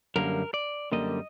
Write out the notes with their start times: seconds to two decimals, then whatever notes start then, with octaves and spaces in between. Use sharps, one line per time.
0.16 F#2 D3 G3 A#3 A#4
0.54 D5
0.92 F#2 D3 G3 A#3 D#5